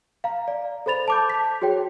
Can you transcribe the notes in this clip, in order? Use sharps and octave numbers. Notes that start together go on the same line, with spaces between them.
F5 A#5
D5
A4 C5 B5 A6 F7
A5 D6 G6
B6
F#4 G#4 C#5 G5